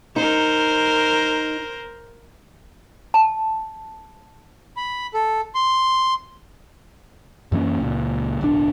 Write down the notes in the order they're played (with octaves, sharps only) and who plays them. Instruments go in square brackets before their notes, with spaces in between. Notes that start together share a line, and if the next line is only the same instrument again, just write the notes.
[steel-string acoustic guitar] D#4 [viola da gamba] A#4 C5
[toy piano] A5
[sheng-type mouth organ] B5
A4
C6
[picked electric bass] F#2 E3 A#3 C#4
C#2 A#2
D1 B1 D4